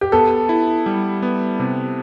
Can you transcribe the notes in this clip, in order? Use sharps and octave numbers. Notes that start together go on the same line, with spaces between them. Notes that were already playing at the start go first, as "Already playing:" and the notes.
G4
B3 A4
E4
G3
B3
C3